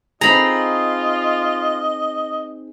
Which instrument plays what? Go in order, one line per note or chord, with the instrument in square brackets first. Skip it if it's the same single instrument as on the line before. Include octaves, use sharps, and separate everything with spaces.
[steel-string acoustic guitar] C4 D#4 G#4 [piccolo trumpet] F4 [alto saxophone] D#5 [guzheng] A#5 B5